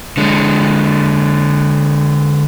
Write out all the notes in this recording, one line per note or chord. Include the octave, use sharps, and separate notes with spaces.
D3 G#3